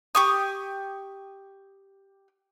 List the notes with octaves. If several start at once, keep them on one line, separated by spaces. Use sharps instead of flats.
G4 C#6 D#6